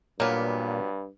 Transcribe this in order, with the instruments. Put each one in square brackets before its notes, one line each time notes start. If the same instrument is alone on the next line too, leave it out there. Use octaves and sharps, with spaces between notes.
[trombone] G2 [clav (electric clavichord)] A#2 A#3 [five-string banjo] F#3 B3